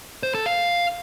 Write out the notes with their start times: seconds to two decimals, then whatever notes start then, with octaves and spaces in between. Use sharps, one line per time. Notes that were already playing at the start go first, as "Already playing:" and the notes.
0.23 C5
0.35 A4
0.46 F5